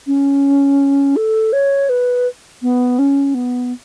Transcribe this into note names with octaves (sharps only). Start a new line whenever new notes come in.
C#4
A4
C#5
B4
B3
C#4
B3